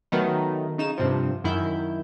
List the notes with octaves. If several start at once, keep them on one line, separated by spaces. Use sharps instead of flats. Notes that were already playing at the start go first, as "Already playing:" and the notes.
D#3 F#3 A3 B3 D#4
C#3 D#4 E7
G2 C3 F3
F#2 D#3 E4 G6